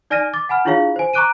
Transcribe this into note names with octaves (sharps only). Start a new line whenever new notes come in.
D#4 D5 G#5 F6 A#6 D#7
D6 A6
F#5 G#5 B5 F6
D4 E4 F4 G#4 C#5 F5
C5 G#5
A#5 C#6 D6 F#6 D7 D#7